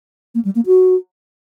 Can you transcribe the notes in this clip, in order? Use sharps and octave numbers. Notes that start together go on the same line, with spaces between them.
A#3
G3
A#3
F#4